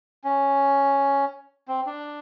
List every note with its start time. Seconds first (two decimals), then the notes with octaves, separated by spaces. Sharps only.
0.24 C#4
1.68 C4
1.86 D4